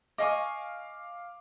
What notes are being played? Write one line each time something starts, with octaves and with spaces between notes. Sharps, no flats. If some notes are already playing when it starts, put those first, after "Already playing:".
D#5 F5 G#5 C#6 D6